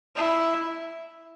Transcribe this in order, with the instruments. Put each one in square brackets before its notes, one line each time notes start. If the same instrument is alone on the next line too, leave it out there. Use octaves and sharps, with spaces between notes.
[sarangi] E4